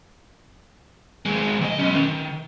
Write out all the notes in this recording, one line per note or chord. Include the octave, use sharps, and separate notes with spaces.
D#3 G#3
D#3 D#5
B1 C#4
D#3